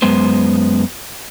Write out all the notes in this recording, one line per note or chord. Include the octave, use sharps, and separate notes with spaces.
F#2 G#3 B3 C5